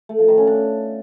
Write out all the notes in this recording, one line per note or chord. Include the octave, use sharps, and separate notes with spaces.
A3
F3
D#3
C#4
D4